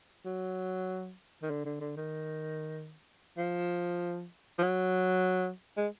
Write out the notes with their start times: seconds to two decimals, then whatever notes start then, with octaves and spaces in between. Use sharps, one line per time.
0.25 F#3
1.42 D#3
1.50 D3
1.65 D3
1.81 D3
1.97 D#3
3.38 F3
4.58 F3
4.63 F#3
5.77 G#3